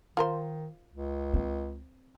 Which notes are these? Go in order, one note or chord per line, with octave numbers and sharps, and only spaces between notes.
D#3 F4 A#4 C5
C#2
C4